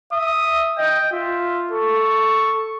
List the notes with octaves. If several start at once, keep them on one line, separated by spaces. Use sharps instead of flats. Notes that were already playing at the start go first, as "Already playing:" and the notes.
E5 D#6
D#5 G5
F4 E5
A4 C#6